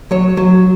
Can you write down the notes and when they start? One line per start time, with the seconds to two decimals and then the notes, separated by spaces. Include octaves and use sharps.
0.11 F#3 C#5
0.37 F#3